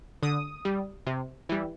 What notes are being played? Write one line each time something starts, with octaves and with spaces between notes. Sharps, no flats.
D3 D#6
G3
C3
E3 G3